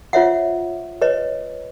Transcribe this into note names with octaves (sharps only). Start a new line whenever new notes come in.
F4 C5 C#5 E5 F#5
B4 C#5 D#5